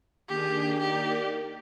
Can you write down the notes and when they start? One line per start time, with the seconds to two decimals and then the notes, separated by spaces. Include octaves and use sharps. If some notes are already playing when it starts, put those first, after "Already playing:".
0.29 D#3 A#3 D4 G4 G#4
0.79 A#3 D#4 G4 A#4 D5